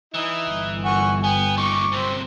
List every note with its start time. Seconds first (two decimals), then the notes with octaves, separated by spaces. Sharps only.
0.14 E3 D#4 E4
0.49 G1
0.85 F#5 G#5 C#6
1.24 B3 G5 G#5
1.57 A#2 D#4 C#6 D6
1.92 F#2 C3 C4